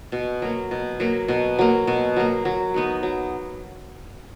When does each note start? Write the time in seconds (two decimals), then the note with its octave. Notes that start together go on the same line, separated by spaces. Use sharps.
0.12 B2
0.42 F#3 A#3
0.71 B2
1.00 F#3 A#3
1.28 B2
1.59 F#3 A#3
1.87 B2
2.16 F#3 A#3
2.45 F#3
2.74 B3 D#4 F#4
3.03 F#3